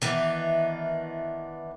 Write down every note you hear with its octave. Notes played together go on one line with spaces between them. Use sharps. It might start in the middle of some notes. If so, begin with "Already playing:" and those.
D#3 E3 B3 D4